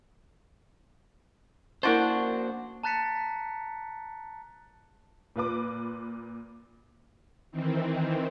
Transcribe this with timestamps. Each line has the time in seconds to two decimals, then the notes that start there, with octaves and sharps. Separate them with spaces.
1.83 A#3 C#4 D4 E4 F#4 A#4 C5 A5
2.83 A5 A#5 F#6 A6 B6 C#7
5.36 A#2 F4 B4 D6
7.51 D#3 E3 C4